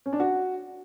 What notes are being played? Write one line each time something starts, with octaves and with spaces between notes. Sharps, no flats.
C#4
D4
F#4